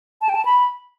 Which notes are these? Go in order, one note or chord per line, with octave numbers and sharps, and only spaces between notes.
A5
G5
A5
B5